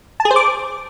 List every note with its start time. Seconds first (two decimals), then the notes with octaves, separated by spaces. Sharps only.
0.20 A5
0.25 G#4
0.31 C5
0.36 D6